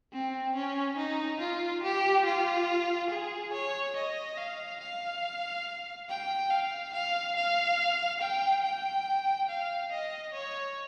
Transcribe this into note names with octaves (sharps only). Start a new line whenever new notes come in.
C4
C#4
D#4
F4
G4
F4
G#4
C#5
D#5
F5
F5
G5
F5
F5
F5
G5
G5
F5
D#5
C#5